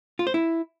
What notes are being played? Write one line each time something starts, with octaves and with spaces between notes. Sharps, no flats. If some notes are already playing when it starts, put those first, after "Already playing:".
F4
C5
E4